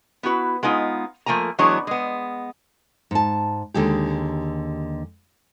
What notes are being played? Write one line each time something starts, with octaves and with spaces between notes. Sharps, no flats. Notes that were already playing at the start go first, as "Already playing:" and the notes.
B3 E4 F#4 B4
G#3 B3 D#4 F4
F3 A3 A#3 G#5 A#5
E3 F#3 G#3 B3 D4 C#5
G#3 B3
G#2 A5
D#2 D3 G#3 G4